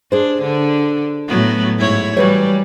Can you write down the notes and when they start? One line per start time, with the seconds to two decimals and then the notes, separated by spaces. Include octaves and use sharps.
0.12 D4 G4 G#4 C5
0.42 D3
1.28 A2 F#3 B3
1.78 G#2 E4 C#5
2.17 E3 F#3 G3 B4 C#5